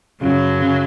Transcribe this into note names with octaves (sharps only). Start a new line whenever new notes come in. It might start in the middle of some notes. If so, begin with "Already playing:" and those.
F#2 C#3 F#3
C#3